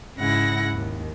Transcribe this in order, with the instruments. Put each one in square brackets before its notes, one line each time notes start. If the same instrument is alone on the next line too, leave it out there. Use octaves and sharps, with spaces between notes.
[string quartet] G#2 C#3 E4 F#5 A#6
D#2